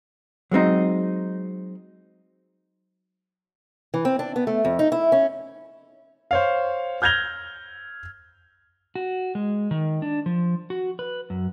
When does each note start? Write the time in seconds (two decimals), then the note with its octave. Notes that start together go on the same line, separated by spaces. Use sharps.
0.51 F#3 G#3 C4 D#4
3.94 E3
4.05 C4
4.19 D4
4.36 B3
4.47 A3
4.65 F2
4.79 D#4
4.92 E4
5.12 C#4
6.31 C5 C#5 F5
7.02 F6 G6 G#6 A#6 F7 G7
8.95 F#4
9.35 G#3
9.71 D#3
10.02 D4
10.26 F3
10.70 F#4
10.99 B4
11.30 F#2